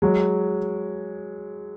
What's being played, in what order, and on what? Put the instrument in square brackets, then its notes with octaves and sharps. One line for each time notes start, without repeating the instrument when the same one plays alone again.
[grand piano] F#3 G#3